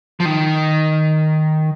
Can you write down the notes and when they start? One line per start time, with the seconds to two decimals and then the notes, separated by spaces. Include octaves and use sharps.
0.20 F3
0.25 D#3